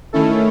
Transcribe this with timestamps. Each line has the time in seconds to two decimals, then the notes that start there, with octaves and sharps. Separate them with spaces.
0.13 D#3 A3 C#4 E4 A4